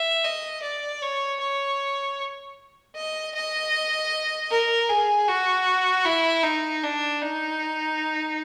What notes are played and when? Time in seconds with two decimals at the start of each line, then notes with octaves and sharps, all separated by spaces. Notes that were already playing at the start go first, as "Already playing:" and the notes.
Already playing: E5
0.25 D#5
0.63 D5
1.02 C#5
1.41 C#5
2.96 D#5
3.35 D#5
4.51 A#4
4.89 G#4
5.28 F#4
6.05 E4
6.44 D#4
6.83 D4
7.22 D#4